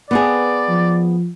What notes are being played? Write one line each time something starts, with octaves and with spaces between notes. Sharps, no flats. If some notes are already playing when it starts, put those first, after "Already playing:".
B3 C4 G#4 D5
F3